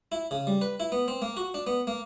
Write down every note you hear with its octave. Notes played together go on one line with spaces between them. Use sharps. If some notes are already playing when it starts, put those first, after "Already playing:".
E4
C#3
G3
B4
E4
B3
C4
A#3
F#4
D4
B3
A#3